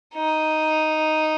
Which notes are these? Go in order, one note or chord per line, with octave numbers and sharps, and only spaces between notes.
D#4